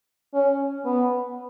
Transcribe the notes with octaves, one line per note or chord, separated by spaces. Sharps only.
C#4
B3